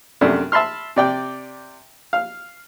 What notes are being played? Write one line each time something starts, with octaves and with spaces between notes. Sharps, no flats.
F#2 C3 A3 D4
E5 A5 B5 C6 F6
C3 D5 G5
F5